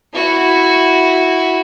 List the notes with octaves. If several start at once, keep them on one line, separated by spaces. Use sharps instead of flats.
E4 F#4